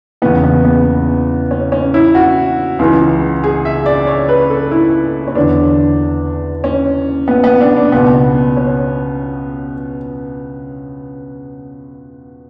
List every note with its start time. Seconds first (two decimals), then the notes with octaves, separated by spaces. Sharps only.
0.22 E2 C#3 E3 B3
0.44 B3
0.65 B3
1.51 C#4
1.72 C#4
1.94 E4
2.15 F#4
2.79 C#2 C#3 E3
3.44 G#4
3.65 E5
3.86 D5
4.07 C#5
4.29 B4
4.50 A4
4.71 E4
5.28 C#4
5.35 E2 D3 D4
6.64 C#4
7.28 B3
7.44 B3
7.61 D4
7.77 D4
7.92 C#2 B2 B3
8.57 C#4